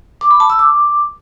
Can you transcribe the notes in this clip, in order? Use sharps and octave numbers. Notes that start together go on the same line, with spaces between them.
D6
B5
A5
E6
D6